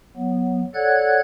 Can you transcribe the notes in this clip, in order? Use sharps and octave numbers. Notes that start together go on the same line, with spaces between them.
F#3 B3
A4 C#5 D5 F#5 F#6 G#6